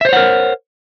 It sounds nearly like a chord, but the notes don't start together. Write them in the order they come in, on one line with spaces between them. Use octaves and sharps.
E5 C5 C#5 F#5 A#4